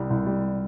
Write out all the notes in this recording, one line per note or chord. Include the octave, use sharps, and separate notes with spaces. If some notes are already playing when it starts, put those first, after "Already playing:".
Already playing: C2 G3
C2
G3